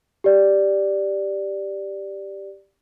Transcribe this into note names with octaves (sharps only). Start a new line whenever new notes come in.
G4 D5